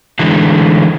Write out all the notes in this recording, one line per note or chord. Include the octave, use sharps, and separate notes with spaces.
D3 E3 G#3 A3